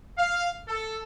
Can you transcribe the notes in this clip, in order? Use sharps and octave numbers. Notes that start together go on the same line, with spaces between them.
F5
A4